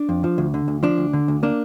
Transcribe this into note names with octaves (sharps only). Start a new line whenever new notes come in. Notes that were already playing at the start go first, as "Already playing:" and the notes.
Already playing: D4
F2
F3
D2
D3
D2
F3 D4
D2
D3
D2
A#3 D4